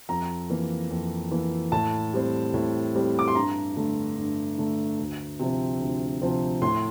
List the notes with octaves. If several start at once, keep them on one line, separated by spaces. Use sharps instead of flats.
F2 A#5
E3 A#3
F2
E3 A#3
A2 A5
G3 C4
A2
G3 C4
D6
C6
G2 A#5
D3 A3
G2
D3 A3
D2
C3 F3 C4
D2
C3 F3 C4
A2 C6